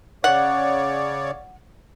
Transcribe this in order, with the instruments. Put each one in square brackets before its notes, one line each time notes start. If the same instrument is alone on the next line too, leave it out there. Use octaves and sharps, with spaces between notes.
[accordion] C#3 C#5 D5 [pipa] F#5